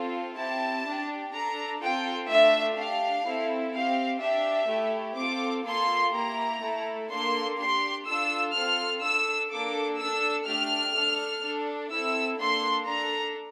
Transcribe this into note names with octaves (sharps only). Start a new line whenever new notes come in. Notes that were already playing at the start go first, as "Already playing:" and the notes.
Already playing: C4 F4 A4
C4 E4 G4 A5
D4 G4
D4 A4 A#5
C4 F4 A4 G5
A3 D4 F4 E5
D4 G4 F5
C4 E4 A4
C4 G4 F5
D4 G4 E5
A3 E4 G4
C4 F4 A4 D6
A#3 F4 A4 C6
A#3 E4 G4 A#5
A3 E4 A4
A#3 D4 A4 C6
D4 G4 C6
D4 F4 A4 E6
C4 F4 A4 F6
D4 A4 E6
A#3 D4 A4 D6
A4 E6
D4
A3 D4 G4 F6
D4 A4
D4 A4
C4 E4 A4 E6
A#3 D4 A4 C6
D4 A4 A#5